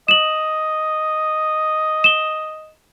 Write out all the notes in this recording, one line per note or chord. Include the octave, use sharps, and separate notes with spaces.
D#5 E7 F#7
E7 G7